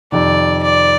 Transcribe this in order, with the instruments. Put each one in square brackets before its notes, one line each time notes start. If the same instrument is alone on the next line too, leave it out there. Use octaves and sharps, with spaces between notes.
[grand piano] F2 C3 D#3 [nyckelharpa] D5
[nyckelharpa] D5